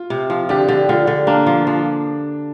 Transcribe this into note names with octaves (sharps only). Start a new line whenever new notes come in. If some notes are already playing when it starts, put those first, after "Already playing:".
Already playing: F4
C3
F3
D3 G4
D3
D3 F4
D3
A#3 D4
F3
F3